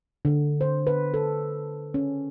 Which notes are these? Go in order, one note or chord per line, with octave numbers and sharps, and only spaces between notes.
D3
C5
B4
A4
C#4